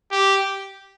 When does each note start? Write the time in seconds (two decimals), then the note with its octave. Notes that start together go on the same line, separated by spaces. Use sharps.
0.11 G4